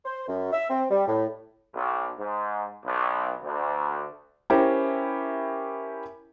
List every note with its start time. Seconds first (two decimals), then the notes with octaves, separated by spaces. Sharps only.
0.05 C5
0.28 F#2
0.53 E5
0.70 C4
0.91 G3
1.07 A2
1.74 B1
2.18 G#2
2.85 B1
3.42 D2
4.50 C#4 E4 G4 A#4 C5